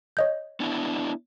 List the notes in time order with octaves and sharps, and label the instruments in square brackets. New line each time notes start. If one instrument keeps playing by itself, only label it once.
[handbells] C#5 D#5 G6
[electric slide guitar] B3 D4 E4